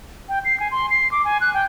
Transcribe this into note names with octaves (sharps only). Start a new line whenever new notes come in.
G5
C7
G#5
C6
C7
D6
G#5
F#6
G5